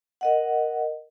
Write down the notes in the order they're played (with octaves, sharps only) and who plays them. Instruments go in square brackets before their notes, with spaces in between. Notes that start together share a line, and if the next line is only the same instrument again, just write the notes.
[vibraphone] A#4 D#5 F#5